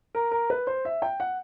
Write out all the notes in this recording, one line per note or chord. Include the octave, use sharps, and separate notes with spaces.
A#4
A#4
B4
C5
E5
G5
F#5